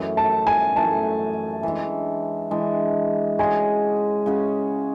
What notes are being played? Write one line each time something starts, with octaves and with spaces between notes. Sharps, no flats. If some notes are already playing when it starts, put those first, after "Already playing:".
Already playing: F#2 E3 A3
A5
G#5
F#2 E3 A3 A5
E3 G#3 D4
E3 G#3 D4
C#3 G#3 C#4 F#4 G#5
C#3 G#3 C#4 F#4